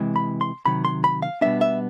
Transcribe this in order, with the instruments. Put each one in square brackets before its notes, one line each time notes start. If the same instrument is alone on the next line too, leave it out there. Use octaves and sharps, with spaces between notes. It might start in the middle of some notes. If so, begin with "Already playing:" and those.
Already playing: [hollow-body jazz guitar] C3 E3 G#3
B5
C6
C3 D#3 F#3 B5
C6
B5
F5
B2 G3 B3 D4 E5
E5